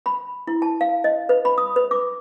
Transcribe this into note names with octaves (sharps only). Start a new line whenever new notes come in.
B5
E4
A5
F5
D#5
B4
B5
D#6
B4
D6